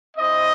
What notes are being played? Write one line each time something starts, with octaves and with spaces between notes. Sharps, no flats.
C4 E4 C5 D#5